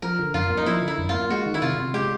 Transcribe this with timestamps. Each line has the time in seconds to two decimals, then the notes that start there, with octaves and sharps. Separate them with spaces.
0.02 F3 A#4
0.19 D3
0.34 F#2 F4
0.50 A#3
0.57 D#4
0.66 F3 E4
0.82 D3
0.88 E4
0.98 F#2
1.09 A#3 F4
1.30 G#3 F#4
1.46 D#3
1.54 E4
1.62 C3 F4
1.78 C3
1.93 G#3 G4